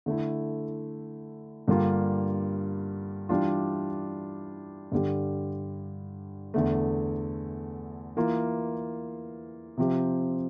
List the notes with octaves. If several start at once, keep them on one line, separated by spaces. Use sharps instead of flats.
D3 A3 E4
G2 D3 G3 A#3 F4
E3 G3 D4 F4
G2 D3 G3
E2 D3 A3
E3 A#3 F4
C3 F3 C4 G4